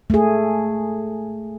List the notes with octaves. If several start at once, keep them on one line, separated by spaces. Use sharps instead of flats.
A3 G#4